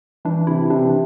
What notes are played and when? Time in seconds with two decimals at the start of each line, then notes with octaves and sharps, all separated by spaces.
0.25 E3 D4
0.47 C3 E4
0.70 C3 D4
0.85 E3